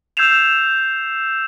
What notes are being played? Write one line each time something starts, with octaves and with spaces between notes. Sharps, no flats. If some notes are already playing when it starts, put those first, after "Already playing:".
E6 G6 G#6 C7 E7 F7